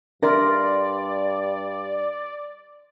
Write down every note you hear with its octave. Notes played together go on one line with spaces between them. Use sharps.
G2 D4 A#4 D5 E5 C6 A6 A#6